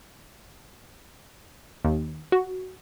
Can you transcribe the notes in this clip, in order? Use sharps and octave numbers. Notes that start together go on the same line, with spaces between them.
D#2
F#4